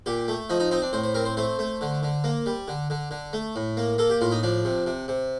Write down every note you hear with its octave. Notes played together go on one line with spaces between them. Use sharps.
A#2 G4
A3
F3 D#4
D#4
C4 D#4
D4
A2 C5
C5
C4 A#4
C5
A3 C5
A3
D3
D3
A#3
G3
D3
D3
D3
A3
A2
A#3
A#3 A4
G4
A2 F4
D#4
F3 D4
C3
C3
C3